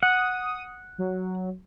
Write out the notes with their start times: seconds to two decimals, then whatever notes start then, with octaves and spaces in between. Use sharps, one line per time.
0.03 F#5 D#6
0.98 F#3